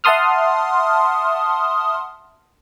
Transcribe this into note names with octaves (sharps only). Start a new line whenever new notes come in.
E5 F#5 A5 C6 D#6 F6